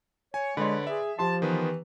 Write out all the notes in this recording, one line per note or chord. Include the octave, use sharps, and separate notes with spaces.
C#5 G#5
D3 G#3 B4 C#5 D5 B5 C6
G#4 E5
F3 G4 A5 C6
D#3 E3 B3 B4